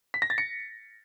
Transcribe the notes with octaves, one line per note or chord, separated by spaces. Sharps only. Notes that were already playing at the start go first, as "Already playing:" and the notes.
B6
A#6
A6
C#7